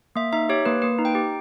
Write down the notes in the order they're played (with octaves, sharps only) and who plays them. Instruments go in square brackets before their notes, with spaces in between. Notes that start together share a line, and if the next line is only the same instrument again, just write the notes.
[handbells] A#3 E5
D#4 E5
G4 C#5
A#3 B4
A#3 B4
D#4
G5
G4